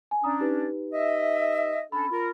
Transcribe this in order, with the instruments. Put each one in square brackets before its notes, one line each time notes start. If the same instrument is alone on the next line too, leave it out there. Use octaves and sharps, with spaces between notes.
[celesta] G#5
[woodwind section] C#4 D4 [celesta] A#5 D#6
[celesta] D#4 G4 B4
[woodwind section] D#5 E5
[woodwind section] C#4 D4 A4 [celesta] B5
[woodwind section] F4 A#4